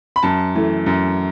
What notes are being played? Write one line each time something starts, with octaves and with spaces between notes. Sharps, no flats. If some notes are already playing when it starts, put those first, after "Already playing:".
B5
F#2 A5
E3 A3
F#2